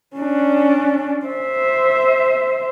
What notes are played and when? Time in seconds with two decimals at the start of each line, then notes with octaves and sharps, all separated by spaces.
0.17 C#4 D4
1.26 C5 E5